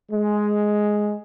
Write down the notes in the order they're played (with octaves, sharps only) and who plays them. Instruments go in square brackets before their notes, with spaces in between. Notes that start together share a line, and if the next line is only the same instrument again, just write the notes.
[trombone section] G#3